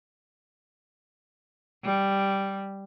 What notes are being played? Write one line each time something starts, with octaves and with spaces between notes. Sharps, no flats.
G3